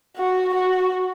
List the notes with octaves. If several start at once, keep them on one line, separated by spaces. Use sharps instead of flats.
F#4
F#4